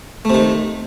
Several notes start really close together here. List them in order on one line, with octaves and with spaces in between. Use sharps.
A3 C3 D#3